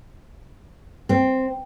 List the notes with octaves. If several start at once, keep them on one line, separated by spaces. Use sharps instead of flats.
C4